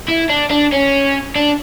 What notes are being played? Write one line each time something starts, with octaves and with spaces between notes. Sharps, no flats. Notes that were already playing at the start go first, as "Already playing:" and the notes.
E4
D4
D4
C#4
D4